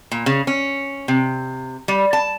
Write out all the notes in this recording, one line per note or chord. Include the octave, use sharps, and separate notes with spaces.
A#2
C#3
C#4
C3
G3
A5